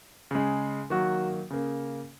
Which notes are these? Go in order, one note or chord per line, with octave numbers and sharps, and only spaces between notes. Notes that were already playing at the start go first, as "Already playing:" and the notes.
C#3 G#3
D#3 F#3 A#3 F#4
C#3 A#3